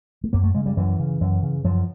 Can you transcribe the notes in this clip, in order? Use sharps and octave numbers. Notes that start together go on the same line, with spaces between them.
A3
F#2 A#3
A3
C#3 G#3
G3
F#2 E3
C#3
F#2
C#3
F#2 F3